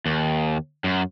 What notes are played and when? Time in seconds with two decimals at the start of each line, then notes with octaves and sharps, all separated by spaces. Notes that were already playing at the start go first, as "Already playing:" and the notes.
0.06 D#2
0.84 F#2